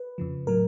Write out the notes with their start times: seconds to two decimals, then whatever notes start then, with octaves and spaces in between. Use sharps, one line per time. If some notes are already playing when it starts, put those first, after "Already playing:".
Already playing: B4
0.18 F2 C#3 F3
0.47 A2 F#3 A#4